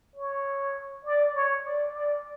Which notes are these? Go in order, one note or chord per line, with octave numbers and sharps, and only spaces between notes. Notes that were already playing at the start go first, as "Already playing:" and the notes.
C#5
D5
C#5
D5
D5